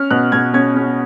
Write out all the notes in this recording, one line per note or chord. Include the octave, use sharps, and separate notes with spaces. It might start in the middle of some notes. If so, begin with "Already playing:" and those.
Already playing: C#4 F6
B2 F#6
B2 G#6
C#4 G#6
C#4